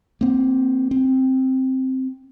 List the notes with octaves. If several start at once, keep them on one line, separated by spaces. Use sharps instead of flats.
A#3 C4
C4